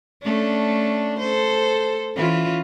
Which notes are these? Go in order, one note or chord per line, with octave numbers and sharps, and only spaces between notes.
A3 C#4 D4
A4 C5
E3 C#4 F4